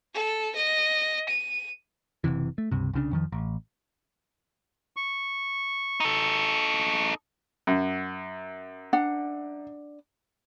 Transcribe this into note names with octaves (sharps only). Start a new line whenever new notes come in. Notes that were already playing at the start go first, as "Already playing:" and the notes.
A4
D#5
D#7
F#1 C#2 C3 E3
A3
C#2 G2 C3
C2 C#3 D4
F2 D#3 F3
A1
C#6
D#4 A4
F#2
D4 F#5